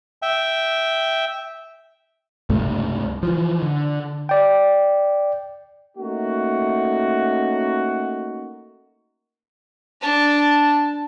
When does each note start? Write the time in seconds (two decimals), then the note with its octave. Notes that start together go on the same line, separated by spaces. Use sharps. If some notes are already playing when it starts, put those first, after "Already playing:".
0.22 E5 G5
2.50 C#2 G2 C3 A3
3.23 E3 F3
3.62 D3
4.29 D5 G5
5.97 A3 A#3 C#4 D#4 F#4
10.01 D4 A5